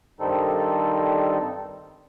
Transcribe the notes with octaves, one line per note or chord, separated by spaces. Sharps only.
G2 D#3 G3 C4 D#4 A4